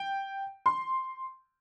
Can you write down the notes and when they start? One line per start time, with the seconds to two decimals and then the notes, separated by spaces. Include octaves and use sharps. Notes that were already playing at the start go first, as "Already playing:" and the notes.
Already playing: G5
0.66 C6